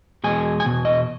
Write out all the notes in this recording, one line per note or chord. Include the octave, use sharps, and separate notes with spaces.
E2 B2 G#3 G#5
G#5
E2 B2
D#5